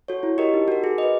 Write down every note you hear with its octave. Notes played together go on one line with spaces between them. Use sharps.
F#4 A4 C#5
E4
G4 A#4 D#5
D#4
F#4 A#4
G#4
B4 D#5